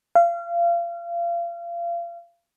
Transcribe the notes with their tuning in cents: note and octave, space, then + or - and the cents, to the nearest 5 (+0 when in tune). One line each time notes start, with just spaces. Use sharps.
F5 -30